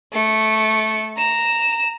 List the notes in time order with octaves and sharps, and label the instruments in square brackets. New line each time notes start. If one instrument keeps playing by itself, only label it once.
[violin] A3 C#7
A#5 E7